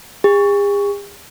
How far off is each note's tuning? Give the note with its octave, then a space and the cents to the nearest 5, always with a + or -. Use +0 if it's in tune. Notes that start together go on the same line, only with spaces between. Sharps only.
G#4 -45